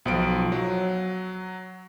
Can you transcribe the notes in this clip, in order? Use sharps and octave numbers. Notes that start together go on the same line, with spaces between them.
B1 F3 D7
F#3